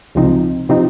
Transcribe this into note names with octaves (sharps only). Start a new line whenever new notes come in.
C#2 C3 F3 C4 D#4
C3 F3 C4 D#4